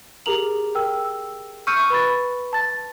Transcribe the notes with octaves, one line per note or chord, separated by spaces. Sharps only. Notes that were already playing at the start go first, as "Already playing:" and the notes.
G4 G#4 A#4 A#5 F7 F#7
A#4 G5 E6
E6
C#6 E6 F6 G6 C#7 D#7
B4 B5 A6
A5 A6